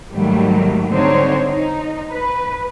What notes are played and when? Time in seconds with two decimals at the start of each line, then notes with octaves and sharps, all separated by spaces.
0.13 G#2 D#3 F#3 G3 A3 A#3
0.90 D3 C4 D#4 C5 C#5
1.51 D#4
2.12 B4